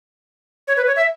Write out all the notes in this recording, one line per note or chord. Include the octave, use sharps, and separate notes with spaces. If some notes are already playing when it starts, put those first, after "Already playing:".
C#5
B4
C#5
E5